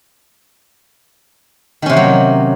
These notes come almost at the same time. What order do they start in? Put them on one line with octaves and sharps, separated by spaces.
D#3 C#4 C3 A#3 F#3